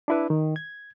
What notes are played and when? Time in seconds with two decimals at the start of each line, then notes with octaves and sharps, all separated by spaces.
0.08 D4 E4 B4
0.30 D#3
0.56 G#6